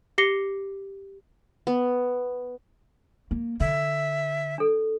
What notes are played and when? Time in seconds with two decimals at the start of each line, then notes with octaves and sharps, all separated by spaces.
0.18 G4 D6 A#6 C7 C#7 G7
1.67 B3
3.31 A#3
3.60 D3 E5
4.58 D4 A4